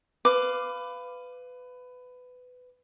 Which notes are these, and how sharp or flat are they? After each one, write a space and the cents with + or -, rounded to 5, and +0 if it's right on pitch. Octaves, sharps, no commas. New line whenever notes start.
B4 +20 F5 -5 D6 +0